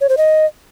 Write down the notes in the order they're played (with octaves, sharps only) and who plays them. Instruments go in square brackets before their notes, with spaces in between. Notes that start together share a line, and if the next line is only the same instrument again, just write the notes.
[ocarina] C#5
C5
D#5